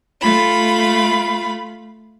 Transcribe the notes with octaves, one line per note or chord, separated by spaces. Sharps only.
A3 F4 B5